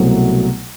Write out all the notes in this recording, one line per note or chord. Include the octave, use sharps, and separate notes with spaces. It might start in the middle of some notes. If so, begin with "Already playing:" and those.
Already playing: C2 B2 F#3 A3